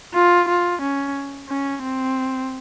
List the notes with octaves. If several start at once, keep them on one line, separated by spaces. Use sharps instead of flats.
F4
F4
C#4
C#4
C4